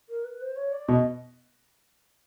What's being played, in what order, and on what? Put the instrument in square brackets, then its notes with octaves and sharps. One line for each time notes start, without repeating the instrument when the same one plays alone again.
[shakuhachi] A#4
B4
C5
C#5
D5
[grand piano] B2 [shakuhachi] D#5